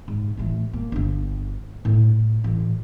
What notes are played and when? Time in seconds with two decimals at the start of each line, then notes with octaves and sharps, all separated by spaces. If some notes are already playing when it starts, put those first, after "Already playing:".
0.08 G#2
0.37 A1 A3
0.73 A#3
0.92 G1 F4
1.85 A2
2.44 A1